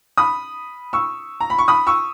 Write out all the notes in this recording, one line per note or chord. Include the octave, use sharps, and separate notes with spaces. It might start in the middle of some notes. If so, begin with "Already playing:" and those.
B5 D#6
C#6 E6
A#5
B5
C#6
B5 D#6
C#6 E6